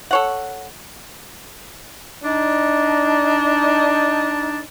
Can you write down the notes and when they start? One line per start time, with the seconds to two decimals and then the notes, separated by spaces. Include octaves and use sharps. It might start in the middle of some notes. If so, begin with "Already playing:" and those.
0.11 A4 C#5 F#5
2.23 D4 D#4